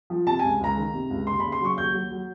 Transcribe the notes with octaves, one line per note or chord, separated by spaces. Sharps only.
F3
C3 A5
C#2 G#5
C#2 A#5
D#3
C3
C#2
D#2 C6
C#3 B5
C6
F#3 C#6
D#2 G6
F#3
F#3